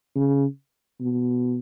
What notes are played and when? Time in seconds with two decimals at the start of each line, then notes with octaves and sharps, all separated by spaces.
0.15 C#3
1.01 B2